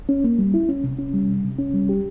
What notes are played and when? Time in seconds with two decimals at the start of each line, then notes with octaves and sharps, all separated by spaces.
0.09 C#4
0.24 A#3
0.39 G3
0.54 E4
0.69 C#4
0.84 C3
0.99 C#4
1.13 G3
1.29 C3
1.44 C3
1.59 C#4
1.74 G3
1.89 G4